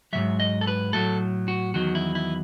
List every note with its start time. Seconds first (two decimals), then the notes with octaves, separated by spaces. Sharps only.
0.13 G#2 D#3 F#3 E5
0.40 D#5
0.61 A4
0.67 B4
0.93 A2 F#3 A4
1.48 F#4
1.74 E2 D#3 F#3 F#4
1.95 E4
2.15 E4